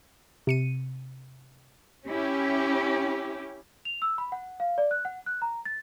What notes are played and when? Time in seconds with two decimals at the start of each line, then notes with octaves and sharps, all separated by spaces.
0.47 C3 C#7 D#7
2.07 C#4 E4 G4
3.85 F7
4.02 E6
4.18 B5
4.32 F#5
4.60 F5
4.78 D5
4.91 F#6
5.05 F#5
5.26 F#6
5.42 A#5
5.65 A6